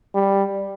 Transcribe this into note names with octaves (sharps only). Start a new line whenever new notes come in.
G3